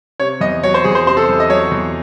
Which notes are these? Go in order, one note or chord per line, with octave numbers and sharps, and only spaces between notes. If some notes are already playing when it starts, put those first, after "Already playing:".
C3 C#5
E2 D#5
F#3 C#5
C5
E2 G#4
C5
C3 C5
A4
E2
D#5
F#3 C#5
E2